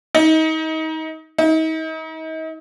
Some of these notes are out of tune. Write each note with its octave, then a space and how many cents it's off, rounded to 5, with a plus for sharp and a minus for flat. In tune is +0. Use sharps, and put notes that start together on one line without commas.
D#4 +30
D#4 +40